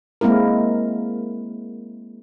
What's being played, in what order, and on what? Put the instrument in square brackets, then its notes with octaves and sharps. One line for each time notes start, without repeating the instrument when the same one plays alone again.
[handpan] G#3 A#3 C4 E4 A#4